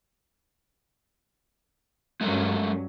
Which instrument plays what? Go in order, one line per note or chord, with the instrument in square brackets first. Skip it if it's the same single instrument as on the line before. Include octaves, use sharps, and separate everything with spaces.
[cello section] G2 F#3 C#4 [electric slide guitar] G#3 A3 A#4